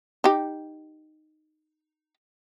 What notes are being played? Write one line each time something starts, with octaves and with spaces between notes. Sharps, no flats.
D#4 G4